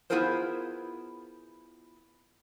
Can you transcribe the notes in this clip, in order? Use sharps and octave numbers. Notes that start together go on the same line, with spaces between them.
B3 E4 F4 G#4 A#4 C5